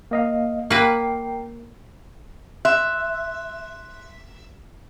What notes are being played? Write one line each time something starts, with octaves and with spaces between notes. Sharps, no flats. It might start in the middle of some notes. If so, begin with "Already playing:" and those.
A#3 D#5 F5
A#3 A#4 B4 G5 C7
E5 C6 F#6